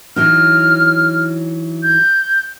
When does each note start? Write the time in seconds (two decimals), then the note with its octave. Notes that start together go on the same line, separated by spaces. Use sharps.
0.16 E3 F#3 D#4 F6
1.83 G6